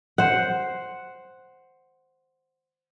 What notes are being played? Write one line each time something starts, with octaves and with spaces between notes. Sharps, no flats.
C5 F#5